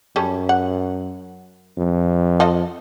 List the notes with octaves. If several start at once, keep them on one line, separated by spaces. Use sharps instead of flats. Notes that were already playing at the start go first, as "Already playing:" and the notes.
F#2 G3 C#4 A4
F#5
F2
F4 A4 D#5